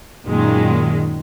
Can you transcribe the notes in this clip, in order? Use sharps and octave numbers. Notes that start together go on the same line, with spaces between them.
F#2 A#2 D#3 G#3